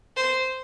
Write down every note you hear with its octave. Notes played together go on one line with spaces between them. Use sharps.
C5